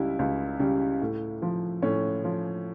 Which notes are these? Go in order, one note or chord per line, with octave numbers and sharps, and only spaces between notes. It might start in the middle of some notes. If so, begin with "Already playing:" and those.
Already playing: C#2 C#3 G3 E4
C#2
C#3 G3
A2
F3
A2 C#4
F3